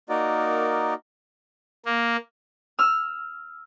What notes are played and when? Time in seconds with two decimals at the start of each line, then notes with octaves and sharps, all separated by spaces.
0.09 A#3 D#4 F#4 A#4 D5 D#5
1.85 A#3
2.79 E6 F6